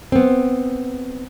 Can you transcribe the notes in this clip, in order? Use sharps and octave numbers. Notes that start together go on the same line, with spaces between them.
B3 C4